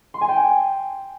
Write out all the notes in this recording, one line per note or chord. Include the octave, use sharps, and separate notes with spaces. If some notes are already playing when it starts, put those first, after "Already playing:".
C6
G#5
G5